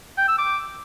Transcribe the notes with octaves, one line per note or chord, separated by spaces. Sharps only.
G5
E6
D6